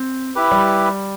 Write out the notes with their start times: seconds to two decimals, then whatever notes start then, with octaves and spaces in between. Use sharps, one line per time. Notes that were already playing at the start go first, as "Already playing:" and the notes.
Already playing: C4
0.35 E4 G4 B4
0.52 G3